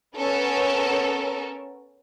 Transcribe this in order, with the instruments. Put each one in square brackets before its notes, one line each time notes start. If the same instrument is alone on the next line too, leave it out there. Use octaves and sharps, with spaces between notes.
[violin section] B3 C#4 A4 A#4